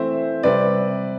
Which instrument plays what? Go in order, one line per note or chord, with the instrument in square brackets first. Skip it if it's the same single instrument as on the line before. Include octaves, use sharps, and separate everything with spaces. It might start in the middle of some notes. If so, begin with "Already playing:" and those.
Already playing: [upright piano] E3 A3 C4 C5 E5
C3 G3 C4 B4 D5